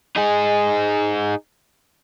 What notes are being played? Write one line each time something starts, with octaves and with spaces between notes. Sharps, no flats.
D#4 G#4